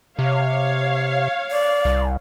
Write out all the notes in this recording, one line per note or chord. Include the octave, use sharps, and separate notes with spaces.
C3 C#5 F5
D5
C2